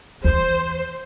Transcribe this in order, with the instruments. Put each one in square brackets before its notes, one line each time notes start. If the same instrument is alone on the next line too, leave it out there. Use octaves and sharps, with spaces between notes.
[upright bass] E2 [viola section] C5